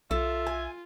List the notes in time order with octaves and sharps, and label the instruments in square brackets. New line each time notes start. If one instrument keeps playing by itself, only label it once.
[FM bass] B1 [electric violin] F4 [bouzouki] A4 [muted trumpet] E5
[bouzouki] G#5